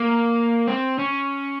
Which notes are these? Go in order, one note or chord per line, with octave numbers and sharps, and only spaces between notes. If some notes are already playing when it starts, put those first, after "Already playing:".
Already playing: A#3
C4
C#4